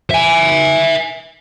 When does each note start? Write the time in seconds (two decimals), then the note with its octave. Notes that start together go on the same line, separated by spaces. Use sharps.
0.11 E5 G#5